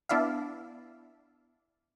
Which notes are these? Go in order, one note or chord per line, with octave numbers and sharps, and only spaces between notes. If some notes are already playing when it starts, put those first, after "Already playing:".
B3 D4 E4 D5 E5 F5